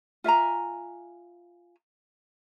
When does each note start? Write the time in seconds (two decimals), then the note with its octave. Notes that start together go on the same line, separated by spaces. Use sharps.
0.24 F4 E5 G#5 A#5